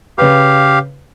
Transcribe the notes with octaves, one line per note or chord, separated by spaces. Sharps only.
C#3 G4 B4 F5